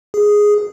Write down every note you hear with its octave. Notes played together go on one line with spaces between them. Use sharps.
G#4